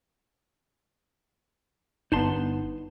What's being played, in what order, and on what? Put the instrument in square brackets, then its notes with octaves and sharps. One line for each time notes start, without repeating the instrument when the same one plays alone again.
[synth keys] G1 B3 [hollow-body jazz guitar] D#4 A5 C6